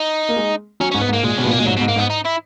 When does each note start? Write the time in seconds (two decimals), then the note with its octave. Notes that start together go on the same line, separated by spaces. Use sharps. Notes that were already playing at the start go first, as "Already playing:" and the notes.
Already playing: D#4
0.29 A#3
0.36 G#3
0.80 F#3 C#4
0.91 G#2 C#4
1.01 B3
1.09 G#2
1.13 A#3
1.23 A#2 G#3
1.37 B2 C#4
1.44 A#2 B3
1.51 B2 A#3
1.59 A#2 G#3
1.66 G#2 F#3
1.77 B2
1.81 G#2
1.88 A#3
1.96 G#2
1.99 B3
2.10 D#4
2.25 E4